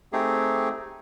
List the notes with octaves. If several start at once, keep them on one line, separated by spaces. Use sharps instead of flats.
A3 C4 D#4 G4 G#4